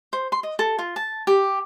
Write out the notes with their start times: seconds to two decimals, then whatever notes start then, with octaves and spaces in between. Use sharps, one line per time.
0.13 C5
0.32 C6
0.43 D#5
0.59 A4
0.79 F4
0.96 A5
1.27 G4